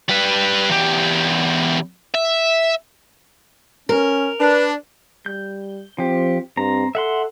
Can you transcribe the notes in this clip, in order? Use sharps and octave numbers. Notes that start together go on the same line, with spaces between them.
G3 B4
E2 G4
E5
C#4 A#4
D4 B4
G3 G6
F3 C4 G4
G2 C4 A#5
A4 E5 F#5 C6